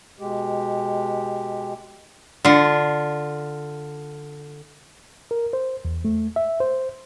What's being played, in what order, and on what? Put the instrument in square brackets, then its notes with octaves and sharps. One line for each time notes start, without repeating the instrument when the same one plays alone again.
[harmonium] B2 G#3 G4
[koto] D3 F4
[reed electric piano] A#4
C5
E2
A3
E5
C5